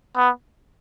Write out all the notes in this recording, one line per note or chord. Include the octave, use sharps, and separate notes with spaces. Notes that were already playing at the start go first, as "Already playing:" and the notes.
B3